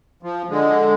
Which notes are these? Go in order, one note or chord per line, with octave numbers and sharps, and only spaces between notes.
F3
D3 G#3